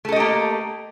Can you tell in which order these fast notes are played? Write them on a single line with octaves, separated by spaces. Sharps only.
A3 A4 D#5 G4 A#3